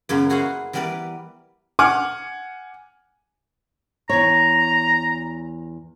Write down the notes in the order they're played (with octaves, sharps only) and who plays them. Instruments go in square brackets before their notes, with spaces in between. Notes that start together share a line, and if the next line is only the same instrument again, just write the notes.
[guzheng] F#2 C#3 A#3 B3
E4 F#4 G#4 C5 F5 F#5
E3 G3 B3 A#4 B4 D5
[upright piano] F#5 G#5 D6 F6
[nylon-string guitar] E2 C#5 [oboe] A#5